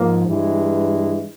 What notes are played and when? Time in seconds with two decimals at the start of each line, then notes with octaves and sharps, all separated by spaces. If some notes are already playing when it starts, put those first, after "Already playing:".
Already playing: G#2 F3 A#3
0.26 G2 E3 G#3